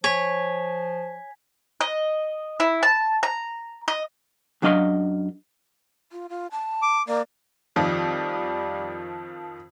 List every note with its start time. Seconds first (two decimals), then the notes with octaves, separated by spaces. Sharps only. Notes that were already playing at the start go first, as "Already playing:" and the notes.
0.04 F3 C#5 G#5 G#6 B6
1.81 D#5
2.60 E4
2.83 A5
3.23 A#5
3.88 D#5
4.62 F#2 F#3 D4 D#5 F5 C6
6.12 F4
6.29 F4
6.51 A5
6.82 D6
7.08 A#3 D5
7.76 F2 D#3 F3 G3